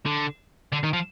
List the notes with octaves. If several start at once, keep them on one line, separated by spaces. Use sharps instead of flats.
D3
D3
D#3
F3